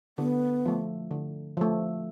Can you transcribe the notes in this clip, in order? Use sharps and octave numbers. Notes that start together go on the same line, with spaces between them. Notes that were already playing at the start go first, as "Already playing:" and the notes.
D3 B3
F3 A3
D3
F3 A3